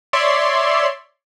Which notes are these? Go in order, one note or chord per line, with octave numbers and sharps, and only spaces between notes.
C#5 D5 E5 C6